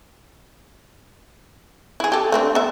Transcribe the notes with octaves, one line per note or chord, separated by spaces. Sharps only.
E4 G#4
G4 A4
A3 C4 D4
B3 E5